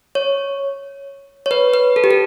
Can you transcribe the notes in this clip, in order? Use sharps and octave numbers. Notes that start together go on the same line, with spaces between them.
C#5
C#5
B4
B4
A4
G4
A4